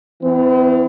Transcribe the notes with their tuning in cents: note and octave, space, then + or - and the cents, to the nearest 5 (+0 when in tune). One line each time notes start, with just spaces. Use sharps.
E3 +5 C4 -45